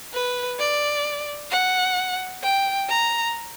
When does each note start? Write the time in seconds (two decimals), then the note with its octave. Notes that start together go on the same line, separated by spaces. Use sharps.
0.13 B4
0.59 D5
1.51 F#5
2.43 G5
2.89 A#5